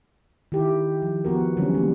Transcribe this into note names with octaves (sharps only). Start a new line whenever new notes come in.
D#3 E4 G4
F3
F3 B3 F#4 A#4
D3 E3 F#3 G3 C4 C#4
G3 A#3